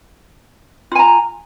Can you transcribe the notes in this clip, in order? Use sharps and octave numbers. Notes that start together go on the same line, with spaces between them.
F4 G#5 A#5